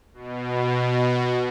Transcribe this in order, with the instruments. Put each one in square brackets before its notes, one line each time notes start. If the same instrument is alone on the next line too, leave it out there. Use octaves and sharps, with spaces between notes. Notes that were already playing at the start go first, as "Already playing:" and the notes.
[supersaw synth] B2